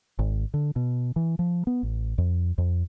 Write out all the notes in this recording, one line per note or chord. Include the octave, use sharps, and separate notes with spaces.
G#1
D3
B2
E3
F3
B3
A1
F2
F2